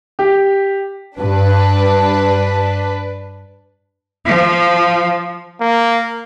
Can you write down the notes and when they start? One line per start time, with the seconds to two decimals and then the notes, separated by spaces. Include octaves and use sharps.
0.19 G4
1.19 G2 D4 B4
4.26 F3
5.61 A#3